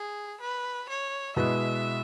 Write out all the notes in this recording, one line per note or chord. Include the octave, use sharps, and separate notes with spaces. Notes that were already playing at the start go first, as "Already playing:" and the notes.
Already playing: G#4
B4
C#5
B2 G#3 E4 B4 E5